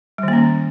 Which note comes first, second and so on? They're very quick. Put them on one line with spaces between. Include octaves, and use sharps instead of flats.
G3 D#3 A#3 C#4